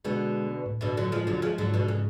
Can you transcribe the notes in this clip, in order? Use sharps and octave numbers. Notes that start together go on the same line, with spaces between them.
B2 D3 G#3
A2
B2 D3
D3 F#3
F3 G#3
D3 F#3
F3 G#3
G#2 D3 F#3
B2 D3
C#3